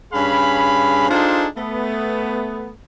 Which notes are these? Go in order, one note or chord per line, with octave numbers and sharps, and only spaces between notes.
G2 C#4 G#4 F5 B5
D4 D#4 F4 G#4 A4 C5
A3 B3